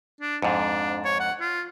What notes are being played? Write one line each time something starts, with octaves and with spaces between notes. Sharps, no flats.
D4
F2 G#2 D4
C#5
F#5
F4